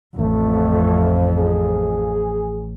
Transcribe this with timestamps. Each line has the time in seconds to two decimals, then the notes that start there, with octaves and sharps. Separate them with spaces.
0.19 A1 F2 A3
1.36 G#4